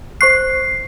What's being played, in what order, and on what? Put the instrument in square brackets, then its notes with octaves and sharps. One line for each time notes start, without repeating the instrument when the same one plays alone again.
[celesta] C5 C#6 F#6 [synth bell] C7